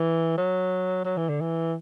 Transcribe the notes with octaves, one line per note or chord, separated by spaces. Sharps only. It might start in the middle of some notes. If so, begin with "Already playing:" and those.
Already playing: E3
F#3
F#3
E3
D3
E3